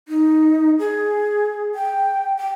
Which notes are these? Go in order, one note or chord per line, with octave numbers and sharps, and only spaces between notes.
D#4
G#4
G5
G5